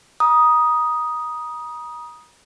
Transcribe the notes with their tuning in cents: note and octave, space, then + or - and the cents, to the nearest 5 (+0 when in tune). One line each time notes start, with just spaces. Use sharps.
A#5 +40 D#6 +0